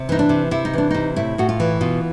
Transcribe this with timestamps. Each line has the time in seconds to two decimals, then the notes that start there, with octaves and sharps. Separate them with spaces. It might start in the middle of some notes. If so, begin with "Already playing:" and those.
Already playing: C3
0.09 E3 D#4
0.19 D4
0.29 C3
0.51 C3 E4
0.65 D#4
0.74 E3 D4
0.91 C3 D#4
1.16 A2 E4
1.38 A2 F#4
1.49 F4
1.60 E3
1.81 B2 F4